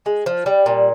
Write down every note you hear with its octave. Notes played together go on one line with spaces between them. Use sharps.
G#3
F3
G3
A#2